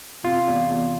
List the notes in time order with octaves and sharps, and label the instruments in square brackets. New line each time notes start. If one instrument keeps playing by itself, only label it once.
[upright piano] C3 [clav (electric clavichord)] F4
[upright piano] E2
E2